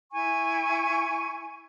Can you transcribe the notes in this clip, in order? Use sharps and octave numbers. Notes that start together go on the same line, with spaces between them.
E4 G#5 C#6